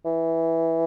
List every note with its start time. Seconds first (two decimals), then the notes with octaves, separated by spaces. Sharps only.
0.05 E3